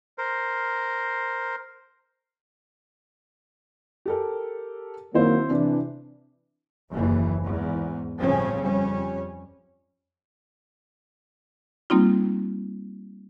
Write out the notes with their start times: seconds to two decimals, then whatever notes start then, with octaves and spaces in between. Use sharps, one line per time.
0.18 A#4 C5
4.06 G4 A4 A#4
5.15 D#3 F#3 A#3 C4 E4 C5
5.50 C3 E3 D4
6.92 F#1 D#2 E3
7.44 E2 G#2
8.18 G1 A2 C#3 F3 C4 C#4
8.59 F2 G3 C#4
11.90 G3 A#3 C4 D#4 F4